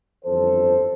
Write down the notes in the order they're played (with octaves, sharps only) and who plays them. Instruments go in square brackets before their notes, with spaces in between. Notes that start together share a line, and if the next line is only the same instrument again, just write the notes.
[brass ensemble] G1 F2 E3 A4 C5